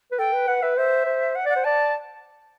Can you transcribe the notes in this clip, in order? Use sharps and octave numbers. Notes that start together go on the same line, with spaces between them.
B4
A4 G5
B4
B4 F#5
B4 E5
C5 E5
C5
F#5
D5 F#5
C5
D5 A5